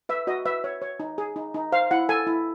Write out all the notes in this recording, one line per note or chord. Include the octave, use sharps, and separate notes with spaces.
B4 E5
F#4 D#5
B4 E5
C#5
C#5
D#4
G#4
D#4
D#4
C5 F5
E4 F#5
A4 G#5
E4